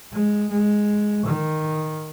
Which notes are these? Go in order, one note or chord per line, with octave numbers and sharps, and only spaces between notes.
G#3
G#3
D#3